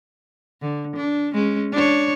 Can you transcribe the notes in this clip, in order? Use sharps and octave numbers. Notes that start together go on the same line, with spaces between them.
D3
D4
G#3 C#4
D4 C#5